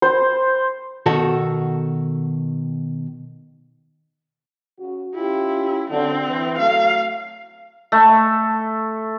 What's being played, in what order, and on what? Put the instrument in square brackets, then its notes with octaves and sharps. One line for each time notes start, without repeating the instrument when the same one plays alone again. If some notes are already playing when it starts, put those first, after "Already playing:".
[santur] C5
[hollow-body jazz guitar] B2 D#3 F#4 A4
[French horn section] C#3 F#4
[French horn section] C#4 F4 G4 [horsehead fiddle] E4
[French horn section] F#2 D3 [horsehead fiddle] C4
[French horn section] E3
[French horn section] F#3 A3 [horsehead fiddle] F5
[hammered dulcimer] A3